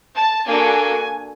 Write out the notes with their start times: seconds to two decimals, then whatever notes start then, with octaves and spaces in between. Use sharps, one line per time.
0.15 A5
0.47 A#3 D4 F#4 A4 G#5